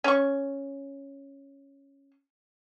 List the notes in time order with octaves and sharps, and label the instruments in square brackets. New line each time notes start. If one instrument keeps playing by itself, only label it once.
[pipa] C#4 C#6